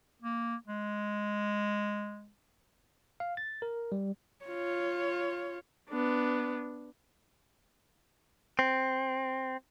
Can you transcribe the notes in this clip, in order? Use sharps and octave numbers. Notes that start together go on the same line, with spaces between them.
A#3
G#3
F5
A6
A#4
G3
F4 C#5
B3 D4
C4